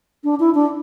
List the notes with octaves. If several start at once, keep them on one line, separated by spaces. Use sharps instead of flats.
D4
E4
D4